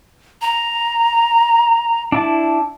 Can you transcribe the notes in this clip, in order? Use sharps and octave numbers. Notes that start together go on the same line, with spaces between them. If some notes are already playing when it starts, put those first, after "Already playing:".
A#5
D4 E4 A5